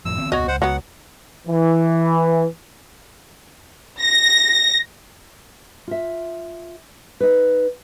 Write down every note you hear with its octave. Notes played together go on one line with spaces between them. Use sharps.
F1 A2 F3 E6
D#3 B3 C4
E1 C#2 B3 F#4 C#5 D#5
C#2 C5 F#5
C#2 F#3 B3 F#5
E3
A#6
F4 E5
D#4 B4